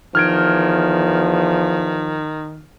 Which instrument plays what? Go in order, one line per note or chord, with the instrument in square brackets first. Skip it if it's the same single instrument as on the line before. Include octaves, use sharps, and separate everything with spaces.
[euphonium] E2 [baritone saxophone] D#3 [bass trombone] F3 [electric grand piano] F6 G#6 D7